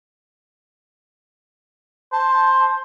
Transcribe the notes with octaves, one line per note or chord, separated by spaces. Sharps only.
C5 A5